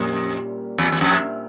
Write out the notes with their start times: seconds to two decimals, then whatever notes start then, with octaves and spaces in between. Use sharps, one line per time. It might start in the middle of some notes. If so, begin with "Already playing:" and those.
Already playing: F2 A#2 G3 A#3 C#4
0.78 E2
0.92 E2
1.01 F2